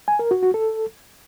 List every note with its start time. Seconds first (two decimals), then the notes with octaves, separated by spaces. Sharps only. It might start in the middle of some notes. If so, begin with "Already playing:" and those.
0.08 G#5
0.19 A#4
0.31 F#4
0.43 F#4
0.54 A4